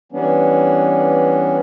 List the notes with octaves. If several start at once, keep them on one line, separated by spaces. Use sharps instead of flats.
E3 G3 B3 C#4 D4